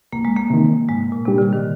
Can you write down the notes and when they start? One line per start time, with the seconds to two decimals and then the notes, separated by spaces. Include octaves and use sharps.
0.13 C2 A#3
0.25 G#3
0.37 A#3
0.50 C3 D#3
0.89 G#2 G#3
1.12 A#2
1.25 C3 G3 D4 G4
1.38 D3
1.53 D#3